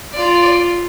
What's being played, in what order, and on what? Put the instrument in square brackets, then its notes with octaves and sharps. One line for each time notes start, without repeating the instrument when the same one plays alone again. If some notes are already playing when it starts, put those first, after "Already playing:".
[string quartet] F4 [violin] D5